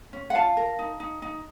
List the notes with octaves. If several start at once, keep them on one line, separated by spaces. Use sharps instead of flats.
C#4
F#5
F4 F5 A5
A#4
D#4
D#4
D#4